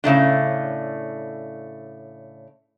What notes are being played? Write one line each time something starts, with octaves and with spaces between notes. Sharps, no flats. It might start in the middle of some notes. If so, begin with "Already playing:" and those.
A2 C#3 A3 D4